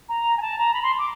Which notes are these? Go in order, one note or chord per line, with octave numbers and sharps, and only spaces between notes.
A#5
G#5
A5
A#5
B5
C6
D6